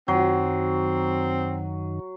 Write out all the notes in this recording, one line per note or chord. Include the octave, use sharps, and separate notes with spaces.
F#2 D#3 F#3 C4